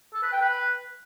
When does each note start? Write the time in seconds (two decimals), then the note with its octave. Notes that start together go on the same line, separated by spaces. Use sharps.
0.13 A4
0.23 B4
0.32 G5
0.41 B4